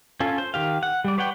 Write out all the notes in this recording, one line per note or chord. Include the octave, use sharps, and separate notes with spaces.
C#4 F4 A4
C5
D#3 G4 F5
F#5
G3 D5
B4 C#5 D5 F#5 G5